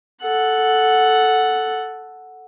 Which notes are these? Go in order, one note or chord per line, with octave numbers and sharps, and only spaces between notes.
A4 F#5